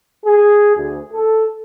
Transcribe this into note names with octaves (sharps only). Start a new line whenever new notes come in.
G#4
D2
A4